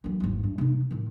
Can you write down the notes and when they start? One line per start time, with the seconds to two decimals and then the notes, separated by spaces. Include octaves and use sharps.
0.04 E3 F#3
0.20 G#1 E2
0.43 G2
0.58 C3 D#4
0.91 A2 D#3